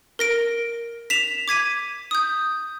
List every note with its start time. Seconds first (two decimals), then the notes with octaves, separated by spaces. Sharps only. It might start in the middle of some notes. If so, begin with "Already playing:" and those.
0.19 A#4 A#6 D7
1.10 B6 E7 F7
1.48 D6 G#6 B6 D#7
2.11 D#6 G6